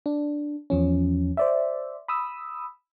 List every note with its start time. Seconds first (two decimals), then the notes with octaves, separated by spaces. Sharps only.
0.06 D4
0.70 E2 F3 C#4
1.37 C5 D5 E5
2.08 B5 D#6 E6